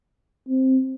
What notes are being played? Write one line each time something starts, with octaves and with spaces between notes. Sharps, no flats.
C4